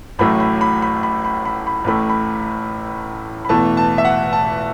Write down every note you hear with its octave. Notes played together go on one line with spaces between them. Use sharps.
A1 A2 F#3 A3 B5
B5
B5
B5
B5
B5
B5
B5
A1 A2 A3 B5
B5
B5
E1 E2 E3 A3 A5
A5
E5
F#5
A5